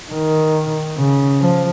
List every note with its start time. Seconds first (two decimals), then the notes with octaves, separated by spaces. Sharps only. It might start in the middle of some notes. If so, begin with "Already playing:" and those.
0.12 D#3
0.97 C#3
1.40 F3